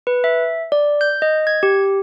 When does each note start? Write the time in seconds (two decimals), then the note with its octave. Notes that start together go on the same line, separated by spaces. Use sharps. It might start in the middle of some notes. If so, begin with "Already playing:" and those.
0.07 B4
0.24 E5
0.72 D5
1.01 G6
1.22 D#5
1.47 G#6
1.63 G4